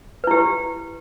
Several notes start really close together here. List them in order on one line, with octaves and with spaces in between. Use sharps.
B4 E4 G4